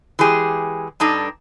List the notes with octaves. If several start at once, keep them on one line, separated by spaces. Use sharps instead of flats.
E3 G#3 G4 G#4
G2 D4 D#4 A4